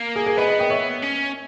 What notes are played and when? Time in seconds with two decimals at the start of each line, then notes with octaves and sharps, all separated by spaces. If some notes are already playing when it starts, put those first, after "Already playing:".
Already playing: A#3
0.16 G#4
0.26 G#4
0.37 B3 B4 D#5
0.48 B4 D#5
0.59 D#5 G5
0.70 C#5 E5
1.02 C#4